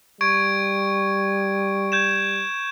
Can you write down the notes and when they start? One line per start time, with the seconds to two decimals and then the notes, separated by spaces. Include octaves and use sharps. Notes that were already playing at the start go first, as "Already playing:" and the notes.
0.21 G3 C#6 G#6 D7
1.92 G6 G#6 E7